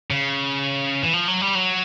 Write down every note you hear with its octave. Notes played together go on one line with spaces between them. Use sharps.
C#3
E3
F3
F#3
G3
F#3